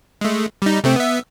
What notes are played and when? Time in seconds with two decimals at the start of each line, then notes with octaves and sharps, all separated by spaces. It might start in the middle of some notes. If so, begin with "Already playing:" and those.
0.21 G#3 A3
0.62 G3 D#4
0.84 C3 A3 C4
0.96 B3 E5